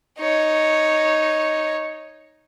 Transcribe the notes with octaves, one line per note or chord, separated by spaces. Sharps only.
D#4 C#5